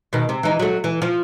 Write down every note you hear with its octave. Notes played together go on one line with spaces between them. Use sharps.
B2 D#3
C3
E3 D#4
F#3 A3
E3
F3